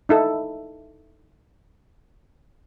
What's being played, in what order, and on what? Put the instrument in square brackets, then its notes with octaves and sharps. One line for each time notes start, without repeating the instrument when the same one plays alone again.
[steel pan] D#4 E4 A4